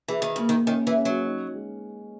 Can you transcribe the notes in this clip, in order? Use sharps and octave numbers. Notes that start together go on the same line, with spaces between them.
E3 G#4
D#3
C#3 A#3
D#3
D#3 C#4
E3
C#4
F#3
D#4
G#3